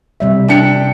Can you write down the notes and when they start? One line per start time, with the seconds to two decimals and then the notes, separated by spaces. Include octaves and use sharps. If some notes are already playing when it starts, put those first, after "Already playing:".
0.20 C3 G3 E5
0.48 D4 G5 C#7